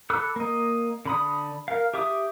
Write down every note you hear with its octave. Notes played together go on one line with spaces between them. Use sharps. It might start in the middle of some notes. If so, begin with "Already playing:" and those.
A4 B5 D6 E6 F#6
A#3 D#5
D3 B5 D#6
A#4 F5
G4 E5 D6 D#6